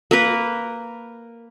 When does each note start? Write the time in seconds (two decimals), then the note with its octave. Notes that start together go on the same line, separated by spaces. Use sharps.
0.11 A#3 A#4 B4